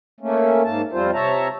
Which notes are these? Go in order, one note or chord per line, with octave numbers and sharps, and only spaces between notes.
A3 A#3 C#4
G#2 A#3 A5
F2 G3 C4 F4 C5
C3 C#5 E5 A5 A#5